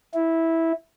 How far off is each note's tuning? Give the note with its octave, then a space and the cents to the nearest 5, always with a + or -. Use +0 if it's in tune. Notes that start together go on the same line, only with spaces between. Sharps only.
E4 -10